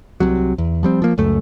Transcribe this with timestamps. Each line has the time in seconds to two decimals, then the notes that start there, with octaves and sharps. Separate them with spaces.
0.20 C2 C3 F#3
0.58 E2
0.83 F3 G3 C4
1.02 F3 A#3
1.18 C#2 F#2 A3